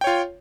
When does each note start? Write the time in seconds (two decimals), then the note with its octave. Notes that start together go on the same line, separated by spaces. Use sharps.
0.01 G5
0.04 C#5
0.07 F4